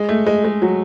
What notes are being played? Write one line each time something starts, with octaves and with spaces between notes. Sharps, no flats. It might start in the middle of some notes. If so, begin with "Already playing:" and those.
Already playing: G#3
A3
G#3
G#3
F#3